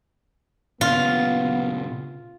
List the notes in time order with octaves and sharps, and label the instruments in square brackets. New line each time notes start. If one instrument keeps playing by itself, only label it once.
[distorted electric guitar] A#2 C#3 [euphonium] B3 [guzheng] F4